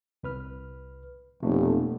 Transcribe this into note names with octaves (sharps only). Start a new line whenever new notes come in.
C2 B4 F6
F1 B2 A3 A#3